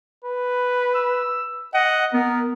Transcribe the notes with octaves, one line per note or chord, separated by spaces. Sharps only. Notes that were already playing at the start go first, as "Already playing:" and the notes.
B4
E6
D#5 F#5
B3 A#4